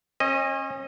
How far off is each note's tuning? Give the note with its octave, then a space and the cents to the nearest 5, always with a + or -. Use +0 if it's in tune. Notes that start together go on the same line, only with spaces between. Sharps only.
C#4 -40 D#5 +0